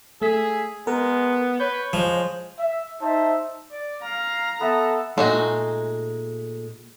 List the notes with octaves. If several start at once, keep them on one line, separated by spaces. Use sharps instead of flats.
A3 G#4 E6 B6
G#3 B3 A#4
B4 C#5 G6
F3 G#3
E5
D#4 C5 E5 A5
D5
F5 A#5
B3 A4 E5 A5
A#2 G#3 A3 D#4 F#4